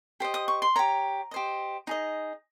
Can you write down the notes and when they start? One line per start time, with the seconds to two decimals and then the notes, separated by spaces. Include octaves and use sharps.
0.20 G4 C5 D#5
0.34 D#6
0.48 C#6
0.62 C6
0.76 G4 C#5 A#5
1.31 G4 C5 D#5
1.87 D#4 G#4 D#5